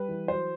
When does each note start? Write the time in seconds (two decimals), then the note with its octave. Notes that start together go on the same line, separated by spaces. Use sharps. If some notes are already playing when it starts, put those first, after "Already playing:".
Already playing: G3 B4
0.09 E3
0.28 F#3 C5